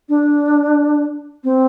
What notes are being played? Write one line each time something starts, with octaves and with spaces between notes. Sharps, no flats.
D4
C4